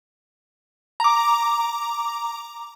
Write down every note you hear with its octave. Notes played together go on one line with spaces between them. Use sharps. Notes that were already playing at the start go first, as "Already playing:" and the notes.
A#5 D6